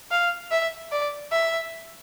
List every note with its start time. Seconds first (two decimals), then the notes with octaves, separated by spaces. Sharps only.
0.11 F5
0.51 E5
0.91 D5
1.31 E5